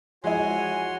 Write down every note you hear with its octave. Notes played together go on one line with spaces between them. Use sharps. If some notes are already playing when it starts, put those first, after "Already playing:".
F3 G#3 E4 F#4 G#4 C#5 G#5 C6